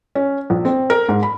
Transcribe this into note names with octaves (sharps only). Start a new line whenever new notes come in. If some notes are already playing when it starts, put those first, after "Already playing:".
C#4
A#1
C4
A#4
G#2
B5